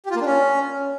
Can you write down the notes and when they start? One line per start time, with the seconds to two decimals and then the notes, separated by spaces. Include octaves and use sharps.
0.06 G4
0.11 F4
0.16 A#3
0.21 D4
0.26 C#4